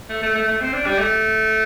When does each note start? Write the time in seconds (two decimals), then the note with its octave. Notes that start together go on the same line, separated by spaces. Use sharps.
0.10 A3
0.23 A3
0.35 A3
0.48 A3
0.61 C4
0.73 D4
0.86 G3
0.99 A3